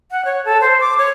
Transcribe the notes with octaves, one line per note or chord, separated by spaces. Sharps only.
F#5
C#5
A4
C5
D6
C#5